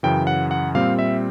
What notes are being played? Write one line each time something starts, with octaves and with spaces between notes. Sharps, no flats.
F#2 C#3 E3 G5
F#5
F#5
A#2 G3 C4 F5
E5